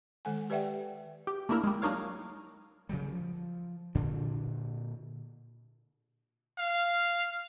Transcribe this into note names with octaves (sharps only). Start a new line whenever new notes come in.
D#3 G#3 A4 F#5 G#5
G4 B4 D5 E5 F#5 G5
G4
A3 A#3 D4 E4 A#4
G3 G#3
F#3 D4 D#4 A#4 C#5 F5
C#3 F#3 G3
F3
A#2 D3 D4
F5